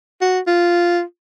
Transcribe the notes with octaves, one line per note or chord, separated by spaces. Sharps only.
F#4
F4